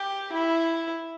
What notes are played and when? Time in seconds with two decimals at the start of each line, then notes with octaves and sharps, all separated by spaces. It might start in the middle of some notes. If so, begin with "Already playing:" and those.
Already playing: G4
0.33 E4